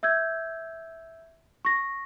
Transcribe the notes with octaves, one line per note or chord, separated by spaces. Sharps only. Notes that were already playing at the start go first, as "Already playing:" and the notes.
E5 E6 G6 G#6
C#6 A#6